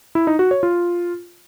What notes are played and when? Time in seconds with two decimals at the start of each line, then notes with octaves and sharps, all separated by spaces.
0.15 E4
0.27 D#4
0.39 F#4
0.51 C#5
0.63 F4